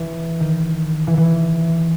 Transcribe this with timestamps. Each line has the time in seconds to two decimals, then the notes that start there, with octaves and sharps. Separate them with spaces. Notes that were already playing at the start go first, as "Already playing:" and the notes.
Already playing: E3
0.40 D#3
1.07 E3
1.17 E3